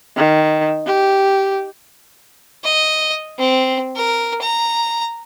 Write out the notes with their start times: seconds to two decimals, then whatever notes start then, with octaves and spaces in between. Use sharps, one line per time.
0.16 D#3
0.86 G4
2.64 D#5
3.38 C4
3.96 A#4
4.41 A#5